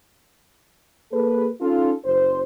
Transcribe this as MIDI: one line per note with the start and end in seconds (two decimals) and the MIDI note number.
1.12 1.47 58
1.12 1.47 68
1.12 1.47 69
1.12 1.47 71
1.61 1.92 61
1.61 1.92 63
1.61 1.92 65
1.61 1.92 69
2.05 2.43 30
2.05 2.43 72